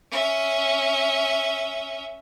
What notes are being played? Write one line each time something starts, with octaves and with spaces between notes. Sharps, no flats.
C#4 E5